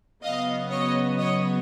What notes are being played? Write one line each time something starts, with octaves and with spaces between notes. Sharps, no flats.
C#3 F#3 B3 D#5 F5
C#5 D#5
C#5 D#5